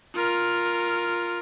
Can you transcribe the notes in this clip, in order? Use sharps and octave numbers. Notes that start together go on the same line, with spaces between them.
F4 A#4